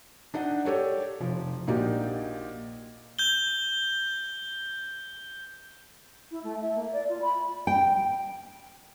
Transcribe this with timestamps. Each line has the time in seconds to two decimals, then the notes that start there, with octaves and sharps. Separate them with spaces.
0.34 D4 D#4 D#5 F#5
0.65 G4 A4 C#5 D5
1.20 F1 F3
1.67 A#1 A#2 D#4 F#4 G4 D5
3.19 G6 G7
6.31 E4
6.43 A3
6.60 E5
6.74 A#3
6.92 D5
7.09 F4
7.21 B5
7.67 G5